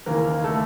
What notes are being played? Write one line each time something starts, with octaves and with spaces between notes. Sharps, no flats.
D#2 C#3 E3 A#3 A#4
A3 A4